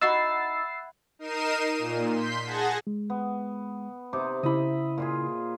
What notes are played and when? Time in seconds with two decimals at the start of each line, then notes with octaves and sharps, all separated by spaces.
0.01 D#4 E4 F#4 F#5 E6 A6 C7
1.19 D#4 A#4 C7 D#7 E7
1.78 A#2
2.14 C6 G6 B6
2.45 G#4 F#5 A5 G#6 A#6
2.87 G#3
3.10 B3
4.13 C3 D#4 D6
4.43 C#3 E4 D#5 E5 B5
4.98 A#2 F4 G#4